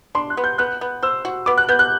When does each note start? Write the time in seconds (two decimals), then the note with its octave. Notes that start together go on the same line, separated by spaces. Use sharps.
0.15 D4 C6
0.30 F#6
0.37 B3
0.44 G6
0.58 B3 F#6
0.81 B3
1.02 C5 E6
1.25 F#4
1.46 B3 D6
1.58 F#6
1.68 B3 G6
1.79 F#6